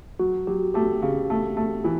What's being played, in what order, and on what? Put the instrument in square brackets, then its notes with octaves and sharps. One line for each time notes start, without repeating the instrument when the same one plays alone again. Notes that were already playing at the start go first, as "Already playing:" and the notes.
[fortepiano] F#3 [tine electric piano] F#4
[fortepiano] F#3 [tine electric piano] G4
[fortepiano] A3 [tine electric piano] G4
[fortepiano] C#3
A3
A3
E3